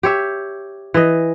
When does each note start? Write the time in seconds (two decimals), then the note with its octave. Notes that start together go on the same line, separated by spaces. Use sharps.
0.03 G4 C#5 E5
0.94 E3 D#5